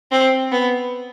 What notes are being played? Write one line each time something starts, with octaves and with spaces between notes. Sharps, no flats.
C4
B3